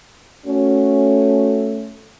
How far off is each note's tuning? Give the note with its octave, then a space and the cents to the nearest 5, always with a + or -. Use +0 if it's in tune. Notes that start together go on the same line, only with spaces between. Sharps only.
A3 +0 C#4 +0 F#4 +0